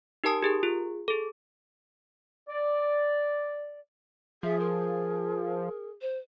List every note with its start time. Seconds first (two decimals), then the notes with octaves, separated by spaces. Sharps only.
0.24 D#4 G4 A#4 A5 D#6
0.42 G4 G#4 A#4
0.63 F4 G#4
1.08 G#4 A4
2.49 D5
4.43 F3 G#4 E5
4.59 A#4
6.02 C5